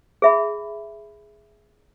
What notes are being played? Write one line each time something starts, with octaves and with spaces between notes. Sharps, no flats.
G#4 E5 B5